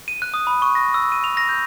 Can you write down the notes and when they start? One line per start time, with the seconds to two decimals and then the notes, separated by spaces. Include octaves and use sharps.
0.08 D#7
0.22 F#6
0.34 D#6
0.47 B5
0.62 C#6
0.75 A#6
0.94 E6
1.12 D#7
1.24 F7
1.37 A#6
1.49 G6